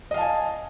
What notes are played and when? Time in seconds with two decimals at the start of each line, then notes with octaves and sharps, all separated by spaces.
0.11 D#5
0.14 F5
0.18 A5
0.21 G#5